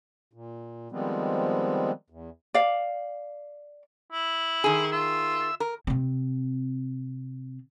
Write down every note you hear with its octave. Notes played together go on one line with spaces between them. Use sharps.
A#2
D#3 F3 G3 G#3 B3 C4
E2
D5 F5
E4
D#3 G#4 C6
F4 E5 E6
A#4
C3 C4